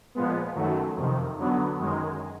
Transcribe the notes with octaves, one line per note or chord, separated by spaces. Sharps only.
A#2 F3 G#3 B3
F#2 D#3 F#3 A3
F2 C3 D#3
D3 F#3 B3
F#2 D#3 G#3